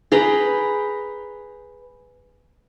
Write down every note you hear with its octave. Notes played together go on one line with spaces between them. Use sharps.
G#4 B4 G5 A#5